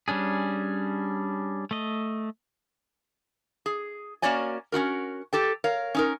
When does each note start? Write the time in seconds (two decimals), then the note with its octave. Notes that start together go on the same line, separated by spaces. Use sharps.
0.08 G3 C#4 D4 G#4
1.71 A3 D#5
3.66 G#4
4.22 A#3 C#4 F#4 C#5 D5 G#5
4.72 C#4 D#4 F#4 A#4
5.33 G4 A4 G5
5.64 A#4 C#5 F5
5.95 C#4 D#4 A#4